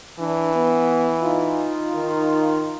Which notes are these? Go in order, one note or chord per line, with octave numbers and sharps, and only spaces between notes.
E3 D4
B3
D#4 F4
D#3